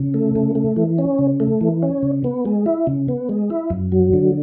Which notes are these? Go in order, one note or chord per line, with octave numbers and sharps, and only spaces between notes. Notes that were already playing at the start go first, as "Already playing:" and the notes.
Already playing: C#3
A3
C#3
A3
E3
C#4
C#3
A3
E3
C#4
C#3
B3
G#3
E4
C#3
B3
G#3
E4
F#2
F#3
D3